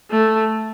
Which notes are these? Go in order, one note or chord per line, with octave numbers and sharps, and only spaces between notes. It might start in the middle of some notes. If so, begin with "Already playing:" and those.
A3